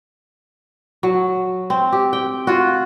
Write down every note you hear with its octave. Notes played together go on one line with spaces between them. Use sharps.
F#3
C4
G4
G5
F4 F#4